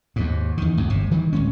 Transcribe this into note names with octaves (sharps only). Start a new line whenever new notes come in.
D#2 G#2
E2 D#3
C#2 F#2
G1 C3
D#3 E3 G3
D1 G#3 C#4